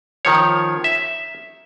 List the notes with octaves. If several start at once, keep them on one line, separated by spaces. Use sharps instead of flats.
D#3 F3 C#5
E5